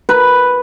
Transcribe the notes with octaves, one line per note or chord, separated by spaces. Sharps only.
B4